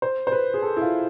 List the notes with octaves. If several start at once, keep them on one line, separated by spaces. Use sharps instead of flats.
C5
C5
B4
G#4
A4
E4
F4